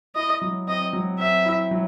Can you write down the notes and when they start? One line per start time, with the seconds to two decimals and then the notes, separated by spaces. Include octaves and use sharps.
0.15 E4 D#5
0.42 F#3
0.67 C4 D#5
0.93 F#3
1.19 C4 E5
1.45 E4
1.71 F#3